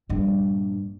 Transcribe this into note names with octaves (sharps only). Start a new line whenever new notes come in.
A#1 G2